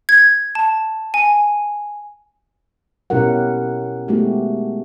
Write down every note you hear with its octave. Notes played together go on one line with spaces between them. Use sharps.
G#6
A5
G#5
B2 C#4 E4 G4 A#4 F#5
G#3 A3 B3 D#4 F#4 G4